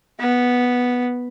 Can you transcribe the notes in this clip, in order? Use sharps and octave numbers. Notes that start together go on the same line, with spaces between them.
B3